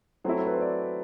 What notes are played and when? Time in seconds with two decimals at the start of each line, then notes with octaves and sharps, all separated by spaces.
0.24 F#3 A3 C4 E4 C5
0.40 A4
0.47 B4
0.54 C5
0.61 D5